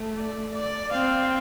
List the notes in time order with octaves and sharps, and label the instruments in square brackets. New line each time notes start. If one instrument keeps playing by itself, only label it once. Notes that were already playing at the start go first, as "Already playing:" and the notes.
Already playing: [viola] A3
[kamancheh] D5
D5
[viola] C4 [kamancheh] F5